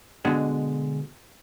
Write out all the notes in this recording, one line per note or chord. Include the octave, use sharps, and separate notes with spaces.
B2 D3 G#3